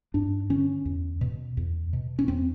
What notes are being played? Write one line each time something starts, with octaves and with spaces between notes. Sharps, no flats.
G2 D4
D3 C#4
E2
B2
E2
B2
C#4
E2 C4